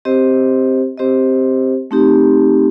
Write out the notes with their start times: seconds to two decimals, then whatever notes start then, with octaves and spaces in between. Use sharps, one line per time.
0.05 C4 G4 C5 D#5
0.98 C4 G4 C5 D#5
1.91 A3 C4 D#4 G4